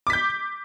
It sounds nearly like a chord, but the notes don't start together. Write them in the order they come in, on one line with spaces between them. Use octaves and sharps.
D6 B6 G6